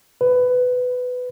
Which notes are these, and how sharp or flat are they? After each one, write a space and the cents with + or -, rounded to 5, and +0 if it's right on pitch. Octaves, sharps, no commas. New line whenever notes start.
B4 +15